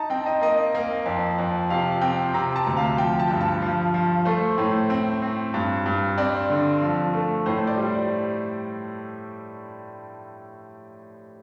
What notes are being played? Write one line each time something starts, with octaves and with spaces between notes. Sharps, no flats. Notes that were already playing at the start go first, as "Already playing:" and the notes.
Already playing: D#4 A5 A#5
C4 G5
D#5
A#3 D#5
A#3
F2
F2
C3 F5
C4 G5
C3 A#5
A5
D2
F5
F3 G5
A5
G2
A5
F3
F3
A3 C5
A2
C4
C4
G2
G2
C4 D5
D3
F3
A3
A2 C5
D5
G3